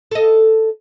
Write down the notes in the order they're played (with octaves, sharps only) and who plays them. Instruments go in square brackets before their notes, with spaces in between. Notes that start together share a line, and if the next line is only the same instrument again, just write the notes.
[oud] A4 D#5